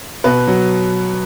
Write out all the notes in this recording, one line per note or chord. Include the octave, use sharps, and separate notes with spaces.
B2 B4
F#3